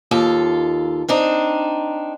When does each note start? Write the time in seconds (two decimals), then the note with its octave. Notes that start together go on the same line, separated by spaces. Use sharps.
0.11 D#2 F4 A4
1.09 C4 D4 D#4